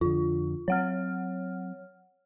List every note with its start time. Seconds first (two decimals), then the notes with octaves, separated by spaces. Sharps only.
0.01 F2 D3 F4
0.68 F#3 C4 C#5 F#5 F6